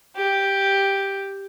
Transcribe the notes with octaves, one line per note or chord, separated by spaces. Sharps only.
G4